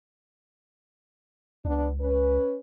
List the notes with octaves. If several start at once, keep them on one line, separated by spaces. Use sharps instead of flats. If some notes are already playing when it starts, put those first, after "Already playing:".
C#2 B3 D4
C#4 B4